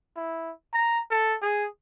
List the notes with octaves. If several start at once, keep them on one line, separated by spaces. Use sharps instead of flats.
E4
A#5
A4
G#4